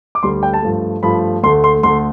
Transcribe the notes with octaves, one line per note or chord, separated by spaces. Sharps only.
D6
D2 D3 G3 C6
G5
A5
G2 F3 A3
G2 F3 A3 B5
D2 D3 A3 C6
C6
D2 D3 A3 C6